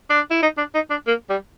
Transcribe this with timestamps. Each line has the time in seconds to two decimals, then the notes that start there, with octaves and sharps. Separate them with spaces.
0.10 D4
0.31 E4
0.42 D#4
0.58 D4
0.74 D#4
0.91 D4
1.07 A#3
1.30 G3